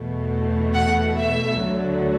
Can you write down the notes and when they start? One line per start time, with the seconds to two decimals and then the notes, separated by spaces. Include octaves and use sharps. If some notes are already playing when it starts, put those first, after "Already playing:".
Already playing: E2 B2 A3
0.73 F#5
1.19 E5
1.63 D2 D3 F#3 A3